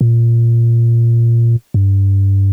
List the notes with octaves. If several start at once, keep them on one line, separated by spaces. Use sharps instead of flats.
A#2
G2